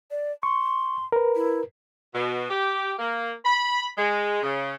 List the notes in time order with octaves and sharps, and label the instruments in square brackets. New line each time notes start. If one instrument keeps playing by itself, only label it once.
[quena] D5
[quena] C6 [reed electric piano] C#6
[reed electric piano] A#4 B4
[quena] E4
[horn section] B2
G4
A#3
B5
G#3
C#3